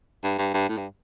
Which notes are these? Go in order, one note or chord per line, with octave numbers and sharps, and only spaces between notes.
G2
G2
G2
A2
G2